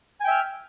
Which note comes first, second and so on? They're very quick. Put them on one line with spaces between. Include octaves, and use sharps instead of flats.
G#5 G5 E5 F6